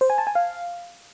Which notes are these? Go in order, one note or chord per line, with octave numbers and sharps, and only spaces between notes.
C5
G#5
A5
G#5
F5